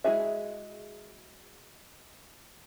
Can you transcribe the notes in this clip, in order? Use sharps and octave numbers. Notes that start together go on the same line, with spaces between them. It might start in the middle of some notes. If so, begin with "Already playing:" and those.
G#3 E4 F#4 G#4 E5